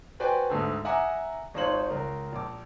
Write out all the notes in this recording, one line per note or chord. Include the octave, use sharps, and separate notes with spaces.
F#4 B4 C5 D5 G5 G#5
D2 G#2 D3
E5 F#5 G#5 A#5 D6 D#6
G#1 D#4 F4 C5 C#5 F#7
C#2 A#4
A#1 D6